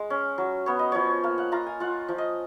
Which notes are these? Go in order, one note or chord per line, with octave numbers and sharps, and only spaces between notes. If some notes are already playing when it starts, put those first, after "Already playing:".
Already playing: G#3
C#4
F#3
B3 C#5
D#5
F3 C#5
A#3 F5
F#5
F4 A#5
G#5
F4 F#5
F3
D#5